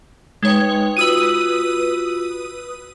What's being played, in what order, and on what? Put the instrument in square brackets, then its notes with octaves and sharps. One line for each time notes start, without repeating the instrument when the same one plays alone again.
[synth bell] G#3 C#5 [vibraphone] D#4 B4 G5
[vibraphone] F4 F#4 E6 [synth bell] B4 D#6 D#7